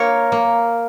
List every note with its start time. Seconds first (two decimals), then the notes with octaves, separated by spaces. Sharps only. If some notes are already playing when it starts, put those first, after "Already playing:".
Already playing: A#3 A#4 C#5
0.32 A#3